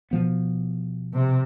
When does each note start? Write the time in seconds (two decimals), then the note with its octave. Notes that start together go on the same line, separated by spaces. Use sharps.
0.11 B2 F3 B3
1.13 C3